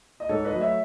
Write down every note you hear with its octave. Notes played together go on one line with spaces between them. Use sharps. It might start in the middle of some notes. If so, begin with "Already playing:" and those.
D#5
G#2 A4 C#5
B4 D#5
F#3 A3
C#5 E5